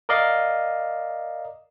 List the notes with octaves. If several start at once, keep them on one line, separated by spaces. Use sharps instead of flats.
A#4 D5 D#5 F5